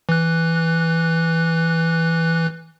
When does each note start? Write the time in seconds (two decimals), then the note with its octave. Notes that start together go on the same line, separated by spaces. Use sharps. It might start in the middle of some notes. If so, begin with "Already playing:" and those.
0.09 E3 F#6